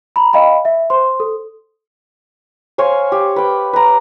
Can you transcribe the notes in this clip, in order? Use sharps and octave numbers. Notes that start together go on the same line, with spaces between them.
A#5 B5
D#5 F5 G5 B5
E5
C5 C6
A4
C5 C#5 F5 G#5
G4
B4 G5
B4 A#5